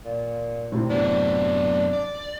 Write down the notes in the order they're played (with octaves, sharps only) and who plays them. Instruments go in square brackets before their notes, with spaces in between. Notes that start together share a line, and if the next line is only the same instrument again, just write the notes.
[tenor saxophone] A#2
[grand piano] A2 C3 C4
[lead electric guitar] F#2 B3 [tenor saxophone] D4
[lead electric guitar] D5